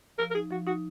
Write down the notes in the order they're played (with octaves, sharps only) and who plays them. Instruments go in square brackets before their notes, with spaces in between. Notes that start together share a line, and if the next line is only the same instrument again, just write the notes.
[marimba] F3 [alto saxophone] A#4
[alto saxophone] A#4
[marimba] D#4 [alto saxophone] G#4
[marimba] F3 [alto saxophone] F#4
[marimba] D#4 [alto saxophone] F#4